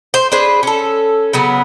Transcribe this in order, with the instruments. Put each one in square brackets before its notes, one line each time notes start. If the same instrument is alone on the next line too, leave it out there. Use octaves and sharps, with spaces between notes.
[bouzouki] C5
D4 G#4 B4 C5
C#4 A4
C#3 F#3 B3